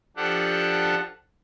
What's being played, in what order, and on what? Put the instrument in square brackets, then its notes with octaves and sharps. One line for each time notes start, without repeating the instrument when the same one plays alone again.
[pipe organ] F3 D4 G4 A4 F#5